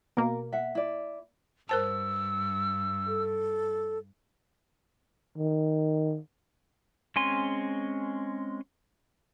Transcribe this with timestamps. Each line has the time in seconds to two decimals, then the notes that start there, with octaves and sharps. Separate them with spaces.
0.17 B2 A#3 A#4
0.52 E5 F#5
0.75 E4 D5
1.69 G2 A#4 C5 A5 E6
3.07 A4
5.38 D#3
7.16 G#3 C4 C#4 G#5 C6